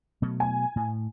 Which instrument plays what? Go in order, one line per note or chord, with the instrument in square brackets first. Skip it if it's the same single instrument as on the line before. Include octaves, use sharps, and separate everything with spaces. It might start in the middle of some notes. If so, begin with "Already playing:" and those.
[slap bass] B2 F#3 A3
[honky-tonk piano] G#5
[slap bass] A2